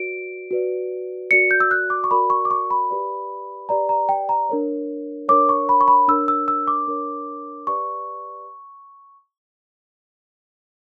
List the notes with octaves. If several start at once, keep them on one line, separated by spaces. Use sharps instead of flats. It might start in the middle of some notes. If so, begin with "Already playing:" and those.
Already playing: F#4 B4 D5 D7
F#4 B4 D5
F#4 A#4 D5 C#7
G6
E6
F#6
D6
C#6
F#4 A#4 D5 B5
C#6
D6
C#6
B5
G4 B4 D5
G4 B4 D5 A#5
A#5
G5
A#5
D4 A#4 C#5
D4 A#4 C#5 D6
C#6
B5
C#6
B5
D4 A#4 C#5 E6
E6
E6
D6
D4 A#4 C#5
G4 B4 D5 C#6